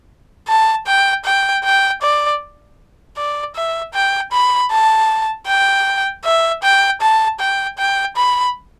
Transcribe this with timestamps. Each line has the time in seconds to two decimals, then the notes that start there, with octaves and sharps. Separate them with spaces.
0.48 A5
0.87 G5
1.25 G5
1.64 G5
2.02 D5
3.17 D5
3.55 E5
3.94 G5
4.32 B5
4.71 A5
5.47 G5
6.25 E5
6.63 G5
7.01 A5
7.40 G5
7.78 G5
8.16 B5